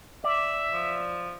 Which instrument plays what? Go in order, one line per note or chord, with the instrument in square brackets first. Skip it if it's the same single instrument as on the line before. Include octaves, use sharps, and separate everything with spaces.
[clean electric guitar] D5 [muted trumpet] E5
[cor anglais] F3